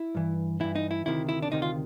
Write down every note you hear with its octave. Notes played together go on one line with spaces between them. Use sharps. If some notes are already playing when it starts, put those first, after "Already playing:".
Already playing: E4
G2 E3
G2 E3 E4
D#4
E4
D2 C3 D#3 E4
E4
D4
D2 C3 D#3 D#4
F4